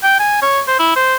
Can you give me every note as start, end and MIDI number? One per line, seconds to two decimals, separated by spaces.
0.03 0.17 79
0.19 0.38 80
0.42 0.61 73
0.67 0.77 72
0.79 0.92 64
0.96 1.16 72